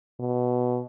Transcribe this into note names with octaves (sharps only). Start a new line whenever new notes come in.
B2